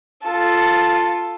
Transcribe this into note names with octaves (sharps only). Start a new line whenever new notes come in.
F4 A4